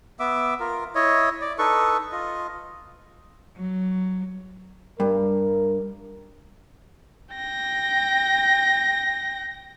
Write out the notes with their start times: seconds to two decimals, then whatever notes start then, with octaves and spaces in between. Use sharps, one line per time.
0.20 B3 E5 D6
0.60 F4 A#4
0.95 E4 C#5 D#5
1.41 D5
1.59 D#4 A4 B4 C#6
2.12 F4 D#5
3.57 F#3
5.00 G2 A#4
7.35 G5 A#6